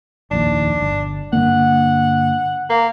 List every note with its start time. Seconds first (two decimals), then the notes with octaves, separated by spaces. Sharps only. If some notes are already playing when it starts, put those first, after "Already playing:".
0.31 F1 A#1 D#2 D4
0.82 G1
1.33 G2 D3 A#3 F#5
2.70 A#3